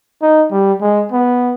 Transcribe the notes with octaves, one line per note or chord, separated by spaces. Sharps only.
D#4
G3
G#3
B3